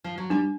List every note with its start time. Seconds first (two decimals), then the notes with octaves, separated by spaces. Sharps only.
0.04 F3
0.18 F#3
0.30 G3 D4